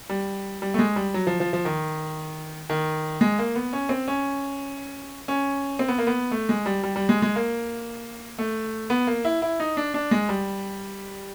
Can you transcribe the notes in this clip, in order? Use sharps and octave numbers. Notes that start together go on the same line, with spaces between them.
G3
G3
A3
G#3
G3
F#3
F3
F3
F3
D#3
D#3
G#3
A#3
B3
C#4
C4
C#4
C#4
C4
B3
A#3
B3
A3
G#3
G3
G3
G3
G#3
G#3
A#3
A3
B3
A#3
E4
E4
D#4
D4
D4
G#3
G3